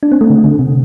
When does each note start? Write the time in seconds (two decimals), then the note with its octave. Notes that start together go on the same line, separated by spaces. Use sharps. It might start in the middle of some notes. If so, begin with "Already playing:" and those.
0.03 D4
0.12 C4
0.21 A3
0.30 D3
0.44 D3
0.59 C3